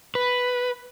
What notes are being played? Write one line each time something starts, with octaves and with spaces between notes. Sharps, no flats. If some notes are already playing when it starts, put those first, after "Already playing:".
B4